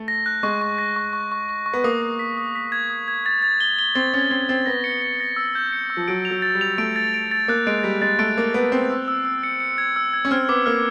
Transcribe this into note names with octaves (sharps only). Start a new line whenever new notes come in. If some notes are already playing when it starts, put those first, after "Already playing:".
Already playing: A3
A#6
F#6
G#3 C#6
C#6
A#6
C#6
C#6
C#6
C#6
C#6
B3
A#3 D#6
D#6
B6
D#6
B6
G#6
D#6
G#6
A6
A6
G7
G7
C4 A6
C#4 A6
C4 G7
C4 A6
B3 A#6
C#7
C#7
A#6
E6
G6
C#7
E6
F3
F#3 D7
F7
F#3
A6
G3
F7
A3 D7
A6
D7
A6
A#3 F#6
G#3 D7
G3 A6
G#3 A6
A3 D7
A#3 A6
B3 D7
C4 A6
E6
E6
E6
C#7
C#7
G#6
E6
G#6
C#4
C4 F6
B3 D6
A#3 F6